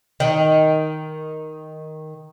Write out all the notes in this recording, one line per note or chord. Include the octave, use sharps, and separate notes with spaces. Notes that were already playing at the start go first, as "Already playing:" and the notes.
D#3 D#4